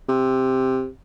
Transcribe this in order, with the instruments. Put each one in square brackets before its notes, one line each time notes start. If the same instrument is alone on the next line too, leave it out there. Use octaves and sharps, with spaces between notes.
[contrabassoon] C3